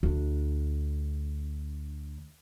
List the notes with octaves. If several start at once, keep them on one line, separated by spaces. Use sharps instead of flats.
D2 D4